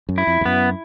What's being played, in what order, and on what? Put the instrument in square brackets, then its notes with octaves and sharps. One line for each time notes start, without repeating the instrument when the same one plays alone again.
[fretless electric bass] F#2
[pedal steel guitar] E4
[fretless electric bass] F2
F2
[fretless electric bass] F#2 [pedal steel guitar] B3